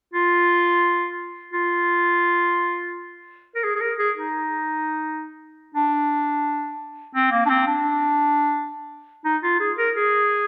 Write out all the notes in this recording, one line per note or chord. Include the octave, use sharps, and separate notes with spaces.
F4
F4
A#4
G#4
G#4
A#4
G#4
D#4
D4
C4
A#3
D4
C4
D4
D#4
F4
G#4
A#4
G#4